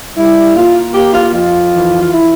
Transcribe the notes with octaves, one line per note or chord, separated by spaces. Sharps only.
G3 E4
A#3 F4
A#3 G4
F4
F2 F4
E3
F4
E3 E4